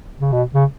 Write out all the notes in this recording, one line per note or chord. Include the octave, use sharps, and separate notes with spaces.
C#3
B2
C#3